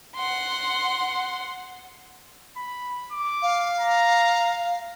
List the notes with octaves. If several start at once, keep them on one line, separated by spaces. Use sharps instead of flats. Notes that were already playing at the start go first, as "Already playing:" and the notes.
F#5 C6
B5
D6
F5
A#5